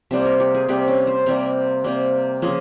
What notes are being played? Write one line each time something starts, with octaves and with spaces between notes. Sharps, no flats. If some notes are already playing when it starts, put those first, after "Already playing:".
C3 G3 A#3 C5
A#4
G4
G#4
C3 G3 A#3 G4
C#4
C5
C3 G3 A#3 A#4
C3 G3 A#3
C#3 F3 A#3 G#4